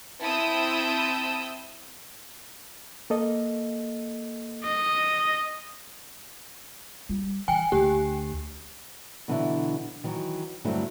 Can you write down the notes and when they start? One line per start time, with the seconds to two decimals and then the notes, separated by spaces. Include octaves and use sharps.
0.21 C4 E4 A5 D#6 E6 G6
3.10 A#3 A4 D#5
4.64 D#5
7.09 G3 F4
7.48 E3 G5 G#5
7.72 D2 G4
9.28 B2 D3 E3 F#3 D4 E4
10.04 D#3 E3 F#3
10.65 G2 D3 F#3 A3 C4 E4